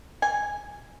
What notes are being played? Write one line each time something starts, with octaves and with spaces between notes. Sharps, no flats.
G#5